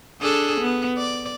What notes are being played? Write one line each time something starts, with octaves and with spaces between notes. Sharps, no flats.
D4 G#4 A4
B3
D5